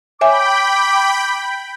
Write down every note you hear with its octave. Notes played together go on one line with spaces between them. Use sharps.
C#5 E5 G5 G#5 B5 D6